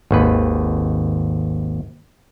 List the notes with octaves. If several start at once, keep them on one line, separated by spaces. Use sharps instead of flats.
G#1 D#2 B4